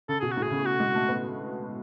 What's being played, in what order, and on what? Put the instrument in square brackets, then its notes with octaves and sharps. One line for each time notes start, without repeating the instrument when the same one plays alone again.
[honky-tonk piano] C#3 [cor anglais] A4
[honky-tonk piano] B2 [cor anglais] G#4
[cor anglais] F#4
[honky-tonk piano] A2
[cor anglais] G#4
[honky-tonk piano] C#3
[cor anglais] F#4
[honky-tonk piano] G#3
A3
B3